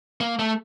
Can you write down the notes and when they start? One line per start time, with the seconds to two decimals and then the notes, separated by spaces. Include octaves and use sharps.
0.21 A#3
0.39 A3